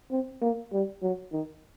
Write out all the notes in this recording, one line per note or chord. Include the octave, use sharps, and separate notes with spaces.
C4
A#3
G3
F#3
D#3